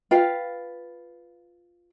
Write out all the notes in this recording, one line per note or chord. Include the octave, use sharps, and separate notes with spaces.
F4 B4 F5 G5